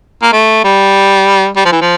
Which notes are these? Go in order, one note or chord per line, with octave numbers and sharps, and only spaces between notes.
A#3
A3
G3
G3
F3
E3
F3